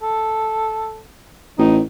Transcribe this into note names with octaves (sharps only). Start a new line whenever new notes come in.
A4
A1 D#4